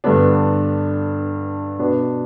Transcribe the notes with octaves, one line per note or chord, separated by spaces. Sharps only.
G2 D3 B3 D4
B2 B3 D4